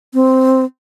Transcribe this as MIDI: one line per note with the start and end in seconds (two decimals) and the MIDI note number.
0.14 0.65 60